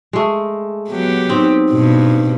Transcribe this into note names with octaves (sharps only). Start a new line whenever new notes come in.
G#3 A3
F#3 B3 G4
C4 D#4
G2 B2